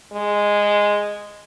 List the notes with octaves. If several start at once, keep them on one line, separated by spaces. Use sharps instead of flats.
G#3